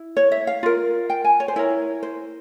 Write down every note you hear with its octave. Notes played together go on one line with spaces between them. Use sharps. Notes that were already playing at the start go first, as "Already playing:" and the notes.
Already playing: E4
C#5
E5
F5
F4 A#4
G5
G#5
C#5
C5
E4 A#4 C#5
C5